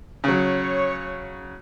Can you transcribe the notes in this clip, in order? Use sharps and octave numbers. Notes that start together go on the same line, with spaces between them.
C#3 F#3 C#5